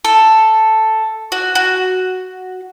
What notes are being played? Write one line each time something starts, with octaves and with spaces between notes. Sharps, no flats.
A4
F#4
F#4